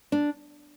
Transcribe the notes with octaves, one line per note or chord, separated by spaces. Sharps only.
D4